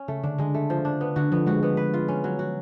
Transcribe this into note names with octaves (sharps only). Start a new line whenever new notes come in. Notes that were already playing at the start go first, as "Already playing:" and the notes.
Already playing: C#4
C#3 A3
D3 D4
D3 G#3
A3
F3
D4
B3
D3 F#4
F3 B3
G#3 F#4
B3
B4
F4
C#4
F#3
F#4